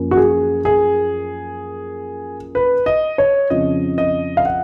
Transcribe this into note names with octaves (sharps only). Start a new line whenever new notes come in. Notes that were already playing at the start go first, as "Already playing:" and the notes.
Already playing: F#2 F3 A#3
F#4
G#4
G#4
B4
D#5
C#5
F2 C#3 F3 D#5
D#5
F5
F#5